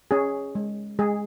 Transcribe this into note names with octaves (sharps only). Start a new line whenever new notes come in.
C#4 G#4
G#3
G#3 G#4